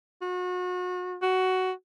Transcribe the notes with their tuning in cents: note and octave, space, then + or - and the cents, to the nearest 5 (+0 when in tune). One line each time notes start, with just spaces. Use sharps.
F#4 -35
F#4 +10